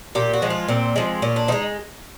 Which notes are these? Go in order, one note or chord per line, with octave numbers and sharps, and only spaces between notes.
A#2 G4
F#4
F3 G#3
F4
A#2 C4
F3 G#3
A#2 C#4
D4
F3 G#3 D#4